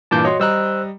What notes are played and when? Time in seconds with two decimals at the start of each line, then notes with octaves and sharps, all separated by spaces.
0.11 G2 A#2 E3 A5 D6 G6
0.25 F#4 C#5 D#5 C6
0.40 G3 C5 D#5 A#5 E6 F#6